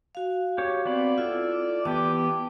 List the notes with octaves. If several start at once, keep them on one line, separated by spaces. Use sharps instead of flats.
F#4 F5
G4 C#5
B3 C4 D5 B5
E4 F4 A4
E3 B3 G4 A5